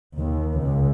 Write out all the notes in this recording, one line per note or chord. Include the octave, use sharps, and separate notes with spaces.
D#2
C#2